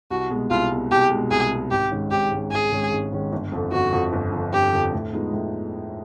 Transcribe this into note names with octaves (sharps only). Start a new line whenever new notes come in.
C2 F#4
B2 G#3
C2 F4
B2 G#3
C2 G4
B2 G#3
C2 G#4
B2 G#3
G#1 G4
G#2 D#3 G#3 C#4
G#1 G4
G#2 D#3 G#3 C#4
G#1 G#4
G#2 D#3 G#3 C#4
G#1
G#2 D#3 G#3 C#4
G1
F2 D3
G1 F#4
F2 D3
G1
F2 D3
G1 G4
F2 D3
A2
F3 G#3 B3 D#4
A2